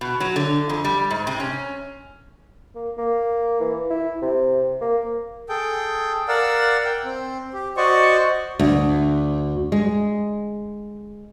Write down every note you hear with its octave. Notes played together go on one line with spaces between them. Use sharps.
B2
F#3
D3
F2
G3
G#2
C3
C#4
A#3
A#3
E3
E4
C3
A#3
G#4 A4 G5
A#4 D5 F5 F#5 E6
G5
C4
G4
F#4 C5 D5 D#5 C#6
D2
G#3